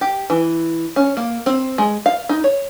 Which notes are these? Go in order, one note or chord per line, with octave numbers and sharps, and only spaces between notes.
G4
E3
C#4
A#3
C4
G#3
F5
D#4
C#5